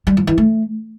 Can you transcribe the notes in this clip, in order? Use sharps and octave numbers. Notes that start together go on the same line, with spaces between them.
G3
F3
E3
A3